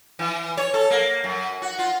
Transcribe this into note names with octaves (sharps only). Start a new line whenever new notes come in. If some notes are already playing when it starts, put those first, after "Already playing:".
E3
C#5
A4
A#3
F#2
F#4
F4